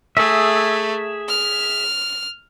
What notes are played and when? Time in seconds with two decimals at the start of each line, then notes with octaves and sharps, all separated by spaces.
0.17 A3 G#4 E5
1.29 F6